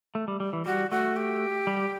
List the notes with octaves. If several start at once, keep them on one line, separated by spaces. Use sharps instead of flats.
A3
G3
G3
E3
G3 F#4
A3 F#4
G4
G3